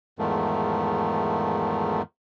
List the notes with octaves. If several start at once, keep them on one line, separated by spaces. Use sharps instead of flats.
E2 G#2 D#3 F3 A3